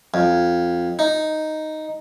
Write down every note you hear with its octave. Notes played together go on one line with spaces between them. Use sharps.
F2
D#4